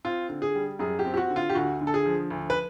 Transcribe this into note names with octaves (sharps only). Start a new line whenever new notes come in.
C4 F4
D3
G#4
G3
F#2 G#4
G4
C4
G4
F#4
D3
F4
G4
D2 F#4
D3
A4
G#4
F3
D2
B4